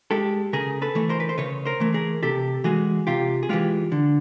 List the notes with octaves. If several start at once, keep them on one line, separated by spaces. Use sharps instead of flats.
G#3 G4 A4
C#3 G#4 A#4
A4 B4
E3 A3
A#4 C5
B4
C5
C#3 B4 C#5
A#4 C5
E3 A3
G#4 A#4
C3 G4 A4
E3 G#3 F#4 G#4
C3 F4 G4
G#4
E3 G#3 F4 G4
D3